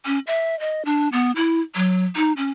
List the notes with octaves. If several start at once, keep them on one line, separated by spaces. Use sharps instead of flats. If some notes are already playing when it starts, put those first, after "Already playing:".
C#4
E5
D#5
D4
B3
E4
F#3
D#4
C#4